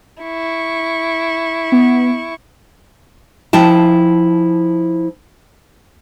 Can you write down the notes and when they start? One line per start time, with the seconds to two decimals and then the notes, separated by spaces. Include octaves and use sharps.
0.22 E4 C#6
1.72 B3
3.53 F3 E4 G5 A5